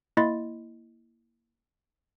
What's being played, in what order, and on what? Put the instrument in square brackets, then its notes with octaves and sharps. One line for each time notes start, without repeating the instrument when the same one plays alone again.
[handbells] A#3 E4 D#5 B5 C6 A6